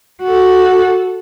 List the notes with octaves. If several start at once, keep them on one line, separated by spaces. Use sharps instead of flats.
F#4 A4